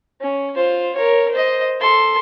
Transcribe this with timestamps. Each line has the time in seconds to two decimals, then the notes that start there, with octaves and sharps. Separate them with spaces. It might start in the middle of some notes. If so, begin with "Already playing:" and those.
0.21 C#4
0.56 F4 C5
0.95 A#4 C#5
1.31 C5 D#5
1.80 A4 C6